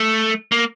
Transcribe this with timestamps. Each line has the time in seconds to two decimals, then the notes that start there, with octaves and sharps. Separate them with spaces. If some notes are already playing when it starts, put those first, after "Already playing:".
Already playing: A3
0.52 A#3